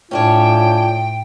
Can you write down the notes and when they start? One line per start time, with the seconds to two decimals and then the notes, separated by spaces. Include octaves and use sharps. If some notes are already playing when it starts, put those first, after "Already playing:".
0.11 A2 C#4 D4 F4 C#5 G5